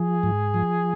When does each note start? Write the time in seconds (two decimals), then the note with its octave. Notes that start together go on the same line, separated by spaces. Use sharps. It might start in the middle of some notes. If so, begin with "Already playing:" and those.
Already playing: F3 G#4
0.23 G#2
0.54 F3